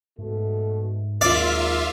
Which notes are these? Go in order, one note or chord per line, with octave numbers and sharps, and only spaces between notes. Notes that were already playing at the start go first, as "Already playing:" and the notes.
G#2 B2 A3
G#1 D#2 A#2 F4 A#4 D5 E5 F5